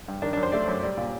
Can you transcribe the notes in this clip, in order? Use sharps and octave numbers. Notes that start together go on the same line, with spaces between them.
G2
D#3 D4
D4
F#2
C5
A3 D5
F#2
G3 D5
A#2